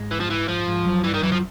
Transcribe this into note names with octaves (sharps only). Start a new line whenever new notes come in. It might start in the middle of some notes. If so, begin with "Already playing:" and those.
Already playing: G#2 G#3
E3
F3
E3
F3
G#2 G#3
F#2 F#3
G2 E3 G3
D#3
F#2 E3 F#3
F3